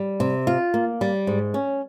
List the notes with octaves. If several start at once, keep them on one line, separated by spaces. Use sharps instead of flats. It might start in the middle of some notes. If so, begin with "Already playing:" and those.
Already playing: G3
C3
F4
A#3
G3
G#2
C#4